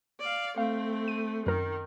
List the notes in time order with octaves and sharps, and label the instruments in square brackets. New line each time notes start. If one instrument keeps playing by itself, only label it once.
[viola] D5 F5
[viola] A3 C4 [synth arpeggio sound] F5
[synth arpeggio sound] D#7
[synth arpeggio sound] F#2 A#4 [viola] D#3